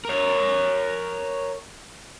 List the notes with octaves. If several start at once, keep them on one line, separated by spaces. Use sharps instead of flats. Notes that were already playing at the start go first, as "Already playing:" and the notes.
A#4 C#5